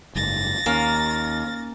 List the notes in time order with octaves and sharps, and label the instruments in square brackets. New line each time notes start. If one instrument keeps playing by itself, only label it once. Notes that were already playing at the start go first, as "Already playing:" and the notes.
[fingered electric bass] F#1 G#2 [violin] A6 A#6
[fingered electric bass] D#2 [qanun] A#3 [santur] C#4 F5